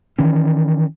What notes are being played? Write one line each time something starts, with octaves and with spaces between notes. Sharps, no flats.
D#3 E3 C#4